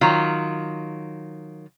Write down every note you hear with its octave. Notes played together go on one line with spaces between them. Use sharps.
D#3 F#3 F4